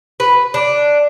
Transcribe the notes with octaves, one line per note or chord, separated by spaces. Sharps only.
B4
D4